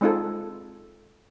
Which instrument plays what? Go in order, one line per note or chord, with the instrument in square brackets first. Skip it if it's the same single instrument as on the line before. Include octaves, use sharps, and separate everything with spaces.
[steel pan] G#3 C4 D#4 F4 A4